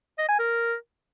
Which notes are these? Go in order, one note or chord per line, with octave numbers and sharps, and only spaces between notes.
D#5
G#5
A#4